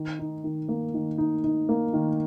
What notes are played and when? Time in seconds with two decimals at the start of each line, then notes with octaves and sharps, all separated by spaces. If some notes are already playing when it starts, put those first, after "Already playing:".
Already playing: D#3
0.19 D#4
0.44 D#3
0.69 A#3
0.94 D#3
1.18 D#4
1.44 D#4
1.69 A#3
1.93 D#3